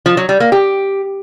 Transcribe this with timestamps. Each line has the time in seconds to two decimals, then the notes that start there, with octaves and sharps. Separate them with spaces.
0.06 F3
0.17 F#3
0.29 G3
0.40 A#3
0.52 G4